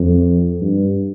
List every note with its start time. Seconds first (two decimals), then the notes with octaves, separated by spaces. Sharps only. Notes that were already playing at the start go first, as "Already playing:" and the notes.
Already playing: F2
0.61 G2